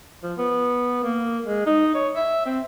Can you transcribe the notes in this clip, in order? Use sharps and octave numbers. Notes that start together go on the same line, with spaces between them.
F3
B3
A#3
G#3
D#4
C#5
E5
C4